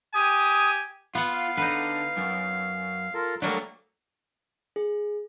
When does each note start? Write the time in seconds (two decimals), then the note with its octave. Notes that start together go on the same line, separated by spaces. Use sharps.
0.14 G4 G#5 D#6
1.15 B3 F4 F#5
1.33 F5
1.57 D3 D#4 B4
2.17 F#2
3.14 F4 A4 A#4
3.42 F#3 G3 A3 A#3 D4
4.76 G#4